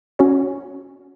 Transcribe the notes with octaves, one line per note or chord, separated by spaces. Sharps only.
C#4 F#4 C#5